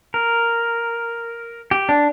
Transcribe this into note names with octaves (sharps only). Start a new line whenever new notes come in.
A#4
G4
D4